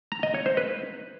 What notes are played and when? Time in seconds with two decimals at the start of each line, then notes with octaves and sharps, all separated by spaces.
0.12 A#5
0.23 D#5
0.34 C#5
0.46 C5
0.57 B4